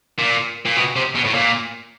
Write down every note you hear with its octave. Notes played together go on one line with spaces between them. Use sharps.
A#2
A#2
B2
C3
B2
A2
A#2